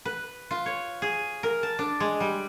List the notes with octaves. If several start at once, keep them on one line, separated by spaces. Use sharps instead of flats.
B4
F4
C#5
G#4
A#4
A5
D4
G#3
G3